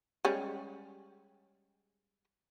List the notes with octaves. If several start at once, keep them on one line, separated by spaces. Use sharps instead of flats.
G3 G#3 C#4